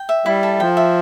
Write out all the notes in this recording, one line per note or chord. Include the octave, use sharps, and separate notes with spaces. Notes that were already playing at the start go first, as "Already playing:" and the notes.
Already playing: G5
E5
G3 E4
A4
F3 G5
E5